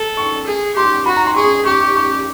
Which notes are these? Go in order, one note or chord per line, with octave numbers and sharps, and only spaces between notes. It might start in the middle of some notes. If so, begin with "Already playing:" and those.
Already playing: A4
C#6
G#4
G4 C6
F#4 B5
A#5
C6
G#4 C#6
G4 C#6
C#6
C#6